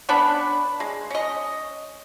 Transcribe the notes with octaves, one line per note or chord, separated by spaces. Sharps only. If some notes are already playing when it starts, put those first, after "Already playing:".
B3 C#4 D4 B5
G#3
C#4 D#5